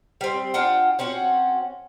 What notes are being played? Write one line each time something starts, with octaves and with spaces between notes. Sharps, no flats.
G3 C4
D4 F4 F#5 G5
C4 C#4 F#4 F#5